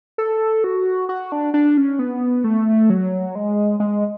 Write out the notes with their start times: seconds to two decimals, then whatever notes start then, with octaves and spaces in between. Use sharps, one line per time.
0.18 A4
0.64 F#4
1.09 F#4
1.32 D4
1.54 D4
1.78 C#4
1.99 B3
2.44 A3
2.90 F#3
3.35 G#3
3.80 G#3